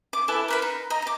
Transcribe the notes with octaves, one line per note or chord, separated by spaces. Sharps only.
D6
E4 A4 B4 G#5
A#4 B4 B5
D#4
D#5 A#5
A#5 D6